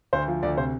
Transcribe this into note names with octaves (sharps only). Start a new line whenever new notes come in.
D2 C5
F3
D2 D5
C3 C5